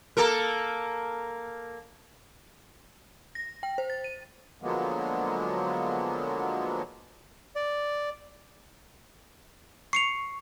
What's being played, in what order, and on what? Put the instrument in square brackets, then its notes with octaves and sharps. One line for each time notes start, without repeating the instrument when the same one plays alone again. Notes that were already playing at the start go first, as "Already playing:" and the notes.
[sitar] A#3 A4 A#4
[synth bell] A#6
G5
C5
A6
D#7
[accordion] D3 F3 F#3 G#3 A#3 B3
[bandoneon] D5
[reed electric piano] C#6 [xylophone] C7 C#7 F7